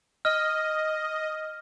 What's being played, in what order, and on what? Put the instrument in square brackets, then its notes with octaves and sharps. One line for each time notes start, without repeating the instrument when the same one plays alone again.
[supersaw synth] D#5 [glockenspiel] F6